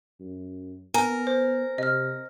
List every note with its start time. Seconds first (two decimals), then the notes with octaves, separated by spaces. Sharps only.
0.20 F#2
0.94 B3 A#4 G#5
1.27 C5
1.78 C3 D#5 F6